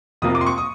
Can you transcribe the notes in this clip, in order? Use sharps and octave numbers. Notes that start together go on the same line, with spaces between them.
F2 C3 F3 A#3 D#6
D6
C6
C#6
D#6